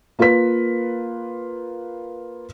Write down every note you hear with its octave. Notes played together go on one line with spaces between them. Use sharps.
A#3 F4 A#4 B4 B6